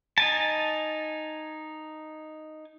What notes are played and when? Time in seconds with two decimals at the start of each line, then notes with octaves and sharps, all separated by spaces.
0.18 D#4 G#5 A5